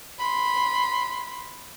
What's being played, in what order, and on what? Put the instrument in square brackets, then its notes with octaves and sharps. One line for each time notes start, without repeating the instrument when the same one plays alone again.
[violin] B5 C6